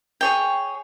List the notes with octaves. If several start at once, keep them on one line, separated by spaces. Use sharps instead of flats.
G#4 C#5 G5